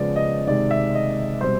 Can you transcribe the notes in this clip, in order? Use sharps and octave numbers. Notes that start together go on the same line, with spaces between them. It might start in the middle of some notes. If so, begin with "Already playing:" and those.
Already playing: C#3 F3 G#3 B3 D5
D#5
C3 D#3 G#3 D5
E5
D#5
B2 G3 C4 C5